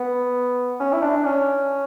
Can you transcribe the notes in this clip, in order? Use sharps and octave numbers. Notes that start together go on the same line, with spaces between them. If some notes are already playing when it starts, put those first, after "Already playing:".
Already playing: B3
C#4
E4
D4
C#4